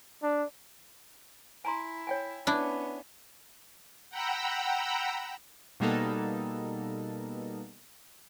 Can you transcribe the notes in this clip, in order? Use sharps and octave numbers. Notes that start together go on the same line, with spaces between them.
D4
E4 G#5 A#5 C6
C#5 G5 G#5
B3 C#4 D4 E4
F#5 G5 A#5 B5 E6
B2 G3 A#3 B3 D#4 A4